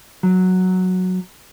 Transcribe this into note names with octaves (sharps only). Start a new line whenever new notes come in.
F#3